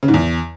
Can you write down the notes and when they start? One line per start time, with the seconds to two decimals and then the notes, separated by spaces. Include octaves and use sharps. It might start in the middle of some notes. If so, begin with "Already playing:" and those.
0.03 C#3
0.08 G#2
0.14 E2